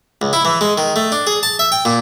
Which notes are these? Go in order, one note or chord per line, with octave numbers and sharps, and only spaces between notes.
C#2
E4
E3
G#3
D#3
A3
D4
G#4
A5
E5
G5
A#2